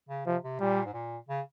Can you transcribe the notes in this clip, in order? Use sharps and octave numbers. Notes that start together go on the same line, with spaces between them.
C#3
C3 F3
C3
A#2 G3
G#2
A#2
C#3